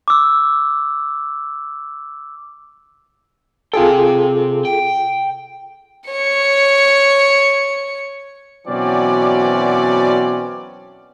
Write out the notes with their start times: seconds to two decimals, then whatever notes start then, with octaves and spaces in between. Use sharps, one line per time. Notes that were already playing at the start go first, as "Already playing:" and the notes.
0.08 D6 E6
3.74 C3 F4 G#4 A4 G5
4.65 G5
6.10 C#5 C#7
8.67 B2 E3 F#3 C4 C#4 D5